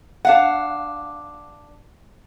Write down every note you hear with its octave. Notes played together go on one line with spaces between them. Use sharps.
D4 F5 F#5